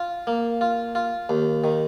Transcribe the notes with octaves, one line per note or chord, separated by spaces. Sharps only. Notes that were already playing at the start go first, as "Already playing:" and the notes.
Already playing: F4
A#3
F4
F4
D#2
D#3